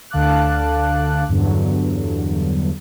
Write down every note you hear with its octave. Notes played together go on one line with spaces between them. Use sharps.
D2 D3 F5 A5 D6 F#6
E2 G2 D3 F#3